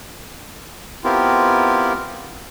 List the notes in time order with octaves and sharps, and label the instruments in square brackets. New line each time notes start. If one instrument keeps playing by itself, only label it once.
[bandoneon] B3 C4 E4 F4 G4 A#4